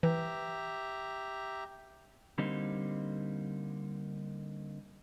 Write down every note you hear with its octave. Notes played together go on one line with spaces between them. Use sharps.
E3 G4 E5 A#5
D3 G3 A#3 C4 D#4